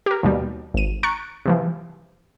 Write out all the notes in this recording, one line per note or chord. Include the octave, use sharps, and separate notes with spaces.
G4 A#4
D#2 B2 G3
G#1 D#7
A#5 C#6 F#6 A6 C#7
C3 E3 F3